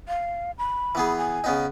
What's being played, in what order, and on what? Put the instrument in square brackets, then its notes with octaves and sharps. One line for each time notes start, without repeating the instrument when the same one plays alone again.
[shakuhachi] F5
B5
[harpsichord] E3 B3 G#4
[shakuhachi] G#5
[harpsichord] C#3 B3 D#4